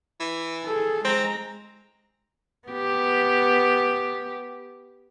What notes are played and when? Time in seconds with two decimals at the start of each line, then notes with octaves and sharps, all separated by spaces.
0.20 E3
0.64 G#4 A4
1.05 G#3 C4 A#5
2.69 B3 G4